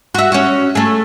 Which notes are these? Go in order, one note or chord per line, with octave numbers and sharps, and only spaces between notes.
F#4 E5
C#4 F#4
A3 G#4